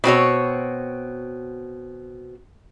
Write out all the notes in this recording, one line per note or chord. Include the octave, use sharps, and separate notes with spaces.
B2 C4 F#4 C#5